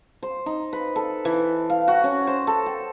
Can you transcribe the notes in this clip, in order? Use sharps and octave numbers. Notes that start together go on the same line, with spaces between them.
C5
D#4
B4
A4
E3
F5
F#4
C#4
C5
A4
G5